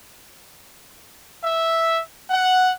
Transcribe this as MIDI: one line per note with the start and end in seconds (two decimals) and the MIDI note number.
1.44 2.02 76
2.30 2.71 78